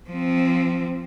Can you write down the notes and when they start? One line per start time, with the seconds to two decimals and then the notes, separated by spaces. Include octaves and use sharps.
0.10 F3 C4